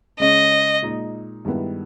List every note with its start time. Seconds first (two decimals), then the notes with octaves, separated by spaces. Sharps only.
0.19 C#3 G#3 C#4 D#5
0.82 A#2 G#3 D#4
1.45 G2 D#3 G#3 B3 E4